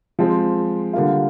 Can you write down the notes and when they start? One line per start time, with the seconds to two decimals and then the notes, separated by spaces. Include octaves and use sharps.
0.19 F3 G#3 C4
0.93 D3 G3 A#3 F4